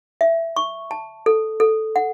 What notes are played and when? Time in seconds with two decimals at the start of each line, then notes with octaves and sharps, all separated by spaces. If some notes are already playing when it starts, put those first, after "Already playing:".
0.21 E5
0.56 C#6
0.91 A5
1.26 A4
1.60 A4
1.96 F#5